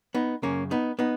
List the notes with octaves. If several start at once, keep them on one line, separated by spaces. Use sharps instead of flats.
B3 D#4
F#2 C#3 A#3 C#4
B3 D#4
B3 D#4